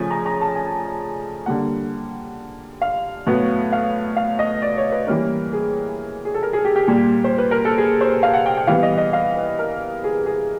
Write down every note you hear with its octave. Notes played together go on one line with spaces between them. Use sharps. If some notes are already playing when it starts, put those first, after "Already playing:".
Already playing: C#3 F3 A3 C#4 G#5
A#5
A#5
A5
G#5
D3 G3 A#3 F#5
F5
A2 F#3 B3
F5
F5
D#5
D5
C#5
B4
E3 G3 A#3 C#4 A#4
G#4
G#4
A4
A#4
G#4
G4
G4
A#2 G3 A#3
C5
B4
A#4
A4
G#4
C5
F5
F#5
G5
G5
E3 G3 B3 F5
D#5
D#5
F5
B4
A#4
G#4
G#4